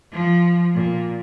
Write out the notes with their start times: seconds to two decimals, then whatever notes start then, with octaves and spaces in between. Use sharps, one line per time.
0.13 F3
0.75 A#2